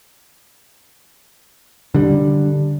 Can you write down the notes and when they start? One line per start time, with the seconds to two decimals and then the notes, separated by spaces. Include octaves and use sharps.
1.94 D3 G3